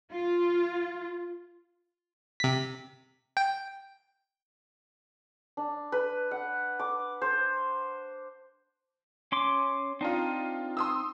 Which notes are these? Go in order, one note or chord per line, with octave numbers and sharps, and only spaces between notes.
F4
C3 B6
G5
D4
B4
F#5
D6
C5
C#4 C6 D6
C4 D4 D#4 F4
C6 D#6 E6